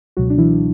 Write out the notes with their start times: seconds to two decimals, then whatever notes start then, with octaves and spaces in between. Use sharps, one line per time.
0.17 C#2 B2 F#3 F#4
0.30 D4
0.38 E3 E4